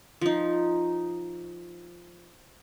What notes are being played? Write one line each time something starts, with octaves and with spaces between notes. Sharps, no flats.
F3 D#4